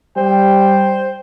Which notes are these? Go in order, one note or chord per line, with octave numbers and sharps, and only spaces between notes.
G3 C5 G5